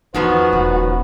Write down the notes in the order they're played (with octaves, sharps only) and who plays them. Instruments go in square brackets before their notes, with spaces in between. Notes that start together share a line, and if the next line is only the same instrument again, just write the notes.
[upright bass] E2 [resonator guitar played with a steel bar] D#3 F3 B3 [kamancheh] F#4 [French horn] B4
[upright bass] D#1